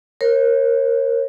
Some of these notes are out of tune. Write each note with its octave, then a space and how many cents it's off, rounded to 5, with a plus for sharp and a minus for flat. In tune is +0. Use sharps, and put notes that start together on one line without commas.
A#4 +0 C#5 -40